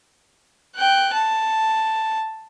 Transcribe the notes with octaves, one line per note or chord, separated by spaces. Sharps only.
G5 F#6
A5